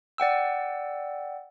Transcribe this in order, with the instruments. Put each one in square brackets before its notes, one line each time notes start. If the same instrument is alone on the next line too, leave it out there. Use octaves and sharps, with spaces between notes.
[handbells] D5 F#5 G5 E6